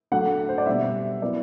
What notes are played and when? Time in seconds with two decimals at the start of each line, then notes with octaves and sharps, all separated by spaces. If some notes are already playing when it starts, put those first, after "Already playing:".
0.12 F#3 A3 D4 F#5
0.49 C5
0.58 D5
0.66 B2 G3 C4 E5
1.21 F#3 B3 E4 D5